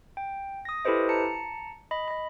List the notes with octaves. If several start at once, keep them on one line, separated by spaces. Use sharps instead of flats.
G5
D#6 A#6
E4 G4 A4 B4 C5 D#5
A5 A#5 C#7
D#5 B5
D#5 B5